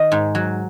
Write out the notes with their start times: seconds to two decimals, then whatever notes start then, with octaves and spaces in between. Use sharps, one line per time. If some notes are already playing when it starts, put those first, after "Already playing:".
Already playing: D#3 D#5
0.12 G#2
0.35 F#3